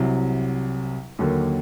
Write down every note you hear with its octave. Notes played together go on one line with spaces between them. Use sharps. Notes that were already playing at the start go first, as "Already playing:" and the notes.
Already playing: C2 C3 F#3
D#2 D3 F#3 A#3